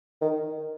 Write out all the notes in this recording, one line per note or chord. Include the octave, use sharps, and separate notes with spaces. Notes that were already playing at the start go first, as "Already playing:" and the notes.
D#3